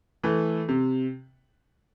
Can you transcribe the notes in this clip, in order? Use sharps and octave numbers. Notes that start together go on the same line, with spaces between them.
E3 A3
C3